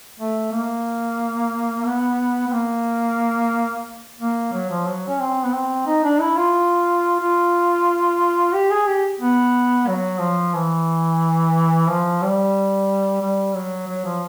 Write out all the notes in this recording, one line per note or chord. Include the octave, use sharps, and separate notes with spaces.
A3
A#3
B3
B3
A#3
A#3
F#3
F3
F#3
C#4
C4
B3
C4
D#4
D4
E4
F4
F4
G4
G#4
G4
B3
F#3
F3
E3
F3
G3
G3
F#3
F#3
F3